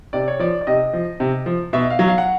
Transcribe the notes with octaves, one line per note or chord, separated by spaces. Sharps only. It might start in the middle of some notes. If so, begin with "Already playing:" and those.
C3 D5
C#5
F3 D5
D5
C3 D#5
F3
C3
F3
B2 E5
F5
F#3
F5
F#5